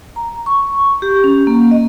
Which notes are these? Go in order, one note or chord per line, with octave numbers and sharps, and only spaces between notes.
A#5
C#6
G4
C#4
A#3
D#5